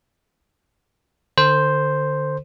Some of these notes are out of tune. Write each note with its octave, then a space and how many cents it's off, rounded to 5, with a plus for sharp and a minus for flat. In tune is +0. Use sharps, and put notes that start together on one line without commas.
D3 +15 A4 +35 C5 +0